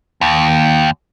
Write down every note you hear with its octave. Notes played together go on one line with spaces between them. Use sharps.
D#2